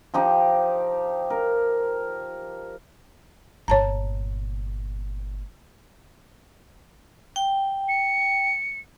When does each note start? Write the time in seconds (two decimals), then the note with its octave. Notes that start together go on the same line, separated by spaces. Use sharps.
0.14 F3 D#4 G4
1.30 A#4
3.68 G1 A#2 C#5 A5 A#5
7.36 G5
7.89 C#7